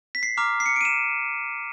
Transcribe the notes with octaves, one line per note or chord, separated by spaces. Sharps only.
B6
C7
A#5 D6 F6
C7
C#7
D7
D#7
E7